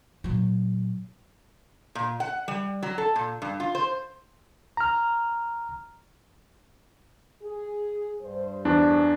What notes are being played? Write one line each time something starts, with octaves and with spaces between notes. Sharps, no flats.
A#2 F#3
A#2
F#5
G3
F#3
A4
A#2
G2
F4
C5
A#5 F6
G#4
G2 C5
E2 D4